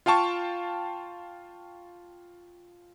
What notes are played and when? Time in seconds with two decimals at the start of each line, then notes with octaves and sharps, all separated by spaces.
0.06 F4 F5 G5 A5 C#6